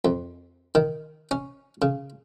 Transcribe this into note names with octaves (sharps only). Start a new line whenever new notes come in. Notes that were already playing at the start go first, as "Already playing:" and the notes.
F2
D#3
C#4
C#3